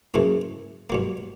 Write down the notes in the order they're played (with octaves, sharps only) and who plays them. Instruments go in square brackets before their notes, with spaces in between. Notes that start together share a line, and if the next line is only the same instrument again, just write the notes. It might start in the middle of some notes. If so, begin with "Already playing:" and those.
[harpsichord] F#2 C#3 E3 A#3
G2 F#3 A#3